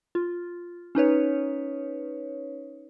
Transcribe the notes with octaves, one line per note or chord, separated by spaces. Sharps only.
F4
C#4 D#4 B4 C#5